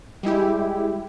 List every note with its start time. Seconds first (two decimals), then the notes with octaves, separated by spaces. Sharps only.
0.23 G3 G#3 E4 G4